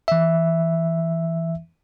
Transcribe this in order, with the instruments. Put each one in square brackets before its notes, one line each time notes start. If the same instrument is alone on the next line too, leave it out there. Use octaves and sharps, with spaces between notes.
[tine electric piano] E3 E5